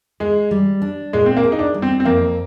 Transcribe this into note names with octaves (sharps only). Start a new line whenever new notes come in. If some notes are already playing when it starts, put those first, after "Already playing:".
G#3 G#4
G3
D4
A#2 G#3
C4
A#3
G#4
D#4
D4
G3
C4
C4
F2 A#3